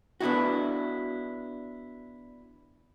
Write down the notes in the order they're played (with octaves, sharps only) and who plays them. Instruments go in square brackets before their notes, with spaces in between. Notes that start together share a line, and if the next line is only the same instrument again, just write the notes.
[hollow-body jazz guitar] B3 D4 E4 F#4